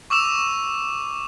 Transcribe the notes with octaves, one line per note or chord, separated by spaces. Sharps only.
C#6 D6 E6 E7 F7